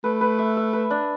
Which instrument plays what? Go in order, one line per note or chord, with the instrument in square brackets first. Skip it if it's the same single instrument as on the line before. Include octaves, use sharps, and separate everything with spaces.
[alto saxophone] A3 [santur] B4
[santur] B4
E5
E5
B4
D4